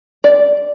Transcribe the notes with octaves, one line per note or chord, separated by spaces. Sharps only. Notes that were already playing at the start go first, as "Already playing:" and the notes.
D5